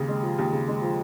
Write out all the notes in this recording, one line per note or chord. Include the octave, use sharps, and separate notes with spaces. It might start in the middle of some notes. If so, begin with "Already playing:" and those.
Already playing: D#2 C#3
G#3
F3
D#2
C#3
G#3
F3